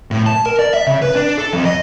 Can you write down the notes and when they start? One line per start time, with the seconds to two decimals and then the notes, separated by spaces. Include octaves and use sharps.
0.11 A2
0.26 A5
0.46 A#4
0.59 D5
0.74 E5
0.87 C#3
1.02 B4
1.16 D4
1.38 A4
1.53 F2
1.66 D#5